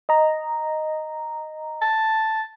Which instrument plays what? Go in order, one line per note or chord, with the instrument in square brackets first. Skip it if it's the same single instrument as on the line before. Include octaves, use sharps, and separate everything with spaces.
[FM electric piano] D#5 A#5
[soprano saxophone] A5